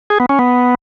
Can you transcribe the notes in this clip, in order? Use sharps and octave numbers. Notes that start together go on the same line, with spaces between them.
G#4
B3
C#4
B3